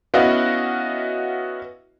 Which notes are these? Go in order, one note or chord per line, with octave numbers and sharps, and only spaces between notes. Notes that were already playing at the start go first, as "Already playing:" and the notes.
B3 C#4 E4 F#4 D#5 F5